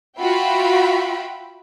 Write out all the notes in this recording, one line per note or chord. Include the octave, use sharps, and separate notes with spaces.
F4 F#4 E5 G5 B5